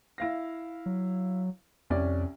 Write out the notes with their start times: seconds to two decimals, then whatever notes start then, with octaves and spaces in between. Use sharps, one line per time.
0.18 E4 F5 A#6
0.86 F#3
1.90 C2 F2 C#4 D5